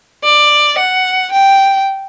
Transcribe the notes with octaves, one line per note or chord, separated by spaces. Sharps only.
D5
F#5
G5